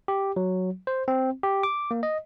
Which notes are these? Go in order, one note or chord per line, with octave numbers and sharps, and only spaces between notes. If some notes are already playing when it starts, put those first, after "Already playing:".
G4
F#3
C5
C4
G4
D6
A#3
D#5